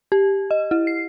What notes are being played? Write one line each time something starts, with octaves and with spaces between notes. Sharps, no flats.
G4
D#5
E4
C7